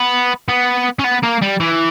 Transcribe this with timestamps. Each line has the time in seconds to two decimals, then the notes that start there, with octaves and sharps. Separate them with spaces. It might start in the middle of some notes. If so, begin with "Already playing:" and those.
Already playing: B3
0.48 B3
0.99 C#4
1.04 B3
1.23 A#3
1.42 G3
1.60 E3